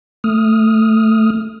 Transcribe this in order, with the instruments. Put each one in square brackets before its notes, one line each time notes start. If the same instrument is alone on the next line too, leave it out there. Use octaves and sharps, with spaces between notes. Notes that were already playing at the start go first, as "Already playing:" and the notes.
[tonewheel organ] A3 D#6 F6